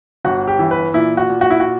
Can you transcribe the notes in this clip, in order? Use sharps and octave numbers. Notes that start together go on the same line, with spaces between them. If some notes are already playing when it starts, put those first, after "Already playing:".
G1 F#4
G4
E3
B4
A#2 E4
F#4
A#2
F#4
E4
F#4